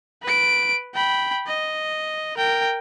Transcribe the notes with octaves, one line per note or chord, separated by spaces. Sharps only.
B4 D7
G5 B5
D#5
A#4 G5